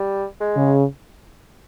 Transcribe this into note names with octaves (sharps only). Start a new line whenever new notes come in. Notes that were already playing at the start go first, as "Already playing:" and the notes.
Already playing: G3
G#3
C#3